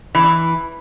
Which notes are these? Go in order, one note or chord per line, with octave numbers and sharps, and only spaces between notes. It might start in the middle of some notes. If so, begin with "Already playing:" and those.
E3